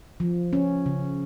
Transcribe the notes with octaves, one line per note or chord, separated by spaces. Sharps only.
F3
C#4
C#3